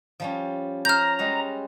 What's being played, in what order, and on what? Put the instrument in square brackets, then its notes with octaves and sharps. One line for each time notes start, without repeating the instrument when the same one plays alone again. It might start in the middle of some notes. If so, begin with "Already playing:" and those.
[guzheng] F3 G3 C#4
[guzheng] C#4 C5 [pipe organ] A#5 [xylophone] F6 G6
[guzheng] G3 G#3 F#4